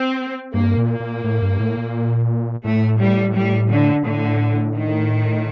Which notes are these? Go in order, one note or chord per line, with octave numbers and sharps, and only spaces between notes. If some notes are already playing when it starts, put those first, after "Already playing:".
Already playing: C4
G2 A#3
A#2
A#3
A#2
A2
G2
A2
A#2
A2 A3
G3
G3
D3
A2 D3
D#3